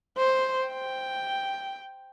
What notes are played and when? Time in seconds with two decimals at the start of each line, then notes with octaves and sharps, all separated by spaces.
0.17 C5
0.67 G5